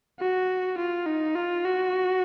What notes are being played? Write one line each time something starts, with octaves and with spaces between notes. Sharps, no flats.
F#4
F4
D#4
F4
F#4